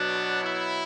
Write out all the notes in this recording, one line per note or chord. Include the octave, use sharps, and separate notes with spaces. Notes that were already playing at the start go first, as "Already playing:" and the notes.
Already playing: B2 F#3 D4
E4